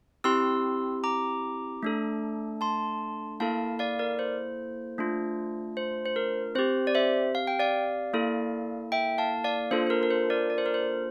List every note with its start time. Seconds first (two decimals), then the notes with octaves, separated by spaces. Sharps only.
0.24 C4 E4 G4 C6 E6
1.04 A#5 D6
1.83 A3 D4 A4
2.61 A5 C6
3.40 A#3 E4 A4 F5 A5
3.79 D5 F5
3.99 A#4 D5
4.19 C5
4.98 A3 D4 F4
5.77 C5
6.05 C5
6.16 A#4
6.55 C4 G4 C5
6.87 D5
6.95 C5 E5
7.35 F5
7.47 G5
7.59 D5 F5
8.13 A#3 E4 A4
8.92 E5 G5
9.18 F5 A5
9.44 D5 F5
9.71 A#3 D4 F4 A4 C5
9.87 C5
9.90 A#4
10.03 A#4
10.11 C5
10.30 A#4 D5
10.50 D5
10.58 C5
10.66 A#4
10.74 C5